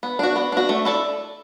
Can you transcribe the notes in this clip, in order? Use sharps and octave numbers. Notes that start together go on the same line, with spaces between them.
B3
D4 F#4
B3
D4 F#4
A3
E4 A4 D5